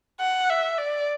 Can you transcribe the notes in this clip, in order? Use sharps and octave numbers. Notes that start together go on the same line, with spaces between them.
F#5
E5
D5